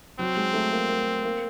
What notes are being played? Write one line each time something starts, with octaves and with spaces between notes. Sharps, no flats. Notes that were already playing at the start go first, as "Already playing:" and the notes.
F#3 C4
G#3
A3
A#3
A#3
A#3